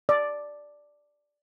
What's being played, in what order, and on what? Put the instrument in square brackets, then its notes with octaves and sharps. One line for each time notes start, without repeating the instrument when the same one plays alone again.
[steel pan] D5